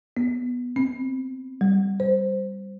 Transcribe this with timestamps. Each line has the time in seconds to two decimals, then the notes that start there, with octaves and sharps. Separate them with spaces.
0.17 B3
0.76 C4
1.61 G3
2.00 C5